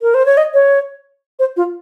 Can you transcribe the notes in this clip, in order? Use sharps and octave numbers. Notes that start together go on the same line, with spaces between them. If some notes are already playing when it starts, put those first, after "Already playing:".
A#4
C5
C#5
D#5
C#5
C5
F4